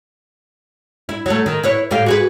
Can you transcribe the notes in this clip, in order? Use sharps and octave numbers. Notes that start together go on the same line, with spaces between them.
E4
F#3 A3
D#3
E4 B4 C#5
A2 G4 F5
F#4 G#4 B4